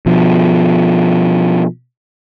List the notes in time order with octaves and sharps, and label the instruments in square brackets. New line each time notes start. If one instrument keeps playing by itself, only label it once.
[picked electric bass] B2 F3